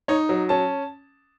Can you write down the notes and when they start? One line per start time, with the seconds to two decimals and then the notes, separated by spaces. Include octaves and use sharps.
0.08 D#4 C#5
0.29 F#3
0.49 C#4 A5